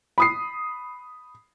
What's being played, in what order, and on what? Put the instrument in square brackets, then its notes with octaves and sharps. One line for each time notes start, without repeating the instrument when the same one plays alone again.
[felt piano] B5 D#6 C7